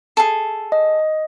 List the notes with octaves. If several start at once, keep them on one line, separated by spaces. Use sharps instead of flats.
G#4 A4
D#5